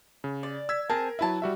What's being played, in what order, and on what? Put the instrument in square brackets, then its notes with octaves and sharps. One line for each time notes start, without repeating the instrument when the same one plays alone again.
[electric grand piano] C#3
[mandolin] D5
[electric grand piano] E6 G#6 B6
[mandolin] C4 G#4 A5 [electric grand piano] A#4
[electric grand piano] F#3 E4 E5 [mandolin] B4 A5
[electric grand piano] G3 F#4 E5